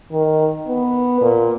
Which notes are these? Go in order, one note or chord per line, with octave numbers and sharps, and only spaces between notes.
D#3
B3
A#2